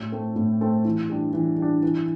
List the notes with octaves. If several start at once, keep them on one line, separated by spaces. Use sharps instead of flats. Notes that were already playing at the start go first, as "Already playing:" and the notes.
Already playing: A2
A3 C4 A4
A2
A3 C4 A4
E3
G3 D4
E3
G3 D4
E3